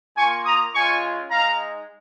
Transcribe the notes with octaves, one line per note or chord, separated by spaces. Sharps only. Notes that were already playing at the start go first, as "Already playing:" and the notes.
A#3 F4 G#5 C#6
A#5 D#6
G#3 C#4 F4 G#5 C#6
G#3 D#4 F5 A#5